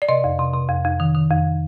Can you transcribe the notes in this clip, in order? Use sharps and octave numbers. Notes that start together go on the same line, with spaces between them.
D5
C3 D#5
F2
C3
C3
F2
F2
D#3
D#3
F2